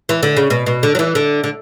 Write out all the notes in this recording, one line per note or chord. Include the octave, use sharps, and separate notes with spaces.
E3
D3
C#3
B2
B2
D3
F#3
E3
D3
D3